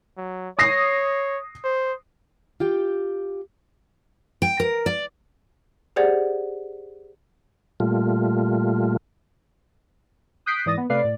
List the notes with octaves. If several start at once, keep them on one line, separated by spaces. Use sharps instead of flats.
F#3
C#5 D#6 A#6 C7
C5
F4 G4 G5
G5
A#4
D5
G4 G#4 C5 D5 F#5 G#6
A#2 G3 A3 F4
D#6 F#6 G6 B6 C7 D7
G#2 E3 D5 D#6 A6 A#6
B3
C3 A3 B4 D5 F5 C7
A2 D5